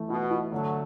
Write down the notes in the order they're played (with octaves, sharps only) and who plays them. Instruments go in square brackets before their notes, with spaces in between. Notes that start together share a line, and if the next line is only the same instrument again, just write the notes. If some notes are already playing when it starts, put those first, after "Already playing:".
Already playing: [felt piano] E3 A3
[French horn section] B2 [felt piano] E4
[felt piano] E4
[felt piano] D3 [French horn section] F#3 A3